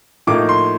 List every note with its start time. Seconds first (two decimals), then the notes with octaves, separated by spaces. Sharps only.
0.27 A2 F3 A#3 D#4 D6
0.49 C6